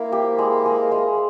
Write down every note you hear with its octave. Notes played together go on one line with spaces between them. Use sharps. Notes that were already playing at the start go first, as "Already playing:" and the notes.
Already playing: A#3 E4 C5
G4
G#3
G#3
G#3